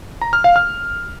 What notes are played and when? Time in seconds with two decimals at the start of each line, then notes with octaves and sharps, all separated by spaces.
0.21 A#5
0.33 F6
0.44 F5
0.56 F6